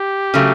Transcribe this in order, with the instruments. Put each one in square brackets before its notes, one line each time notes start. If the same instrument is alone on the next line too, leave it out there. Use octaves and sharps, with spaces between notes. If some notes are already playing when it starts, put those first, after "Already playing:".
Already playing: [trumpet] G4
[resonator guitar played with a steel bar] C#3 F#3 A3